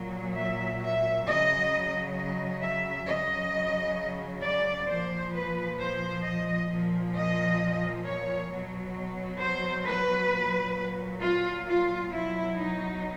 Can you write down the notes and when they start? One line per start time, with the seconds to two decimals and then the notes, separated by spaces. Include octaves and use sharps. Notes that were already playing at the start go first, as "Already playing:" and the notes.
Already playing: A#2 F#3
0.35 E5
0.81 E5
1.26 C#3 F#3 D#5
2.17 D#5
2.62 E5
3.07 C#3 F#3 D#5
4.43 D5
4.89 A#2 F3 C5
5.33 B4
5.79 C5
6.24 D#5
6.68 A#2 F3
7.14 D#5
8.05 C#5
8.50 B2 F#3
9.40 C5
9.86 B4
10.30 A#2 F#3
11.22 F4
11.66 F4
12.12 B2 F#3 E4
12.56 D#4